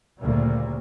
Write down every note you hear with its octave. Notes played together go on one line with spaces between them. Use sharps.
D2 A#2 C#3 G3 A3 A#3